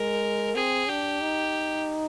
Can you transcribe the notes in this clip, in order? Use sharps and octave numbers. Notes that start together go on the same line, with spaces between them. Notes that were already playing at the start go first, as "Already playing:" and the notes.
Already playing: G#3 A#4
C4 G#4
D4 G4
D#4